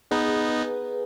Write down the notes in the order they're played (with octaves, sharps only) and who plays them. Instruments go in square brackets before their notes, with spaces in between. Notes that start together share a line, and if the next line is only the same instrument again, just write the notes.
[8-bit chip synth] B3 D#4 [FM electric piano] G#4 B4